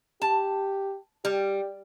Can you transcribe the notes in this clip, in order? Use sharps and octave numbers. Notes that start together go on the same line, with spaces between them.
G4 A5
G3 G4